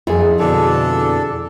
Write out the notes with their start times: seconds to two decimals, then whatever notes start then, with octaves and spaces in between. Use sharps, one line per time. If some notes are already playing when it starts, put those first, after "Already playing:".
0.07 F2 E4 G#4
0.39 B2 D3 D4 A4